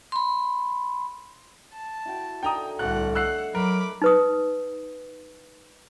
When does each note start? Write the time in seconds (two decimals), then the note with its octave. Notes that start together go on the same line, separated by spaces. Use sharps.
0.12 B5 C6
1.73 A5
2.05 E4 F#4 G5
2.43 D3 D#3 G5 G#5 A#5 D#6
2.79 D1 C2 D3 A3 F#5 F#6
3.15 D#5 F#5 E6 F#6 C7
3.55 F#3 A#4 B5 D6
4.02 D#4 B4 D#6